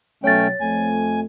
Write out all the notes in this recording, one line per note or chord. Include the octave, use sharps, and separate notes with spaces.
B2 F#3 A3 C#4 C#5 G5 A6
F2 A3 G#5